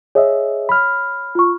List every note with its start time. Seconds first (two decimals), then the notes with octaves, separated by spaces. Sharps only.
0.15 G#4 C#5 D#5 E5
0.69 B5 F6
1.35 F4 C#6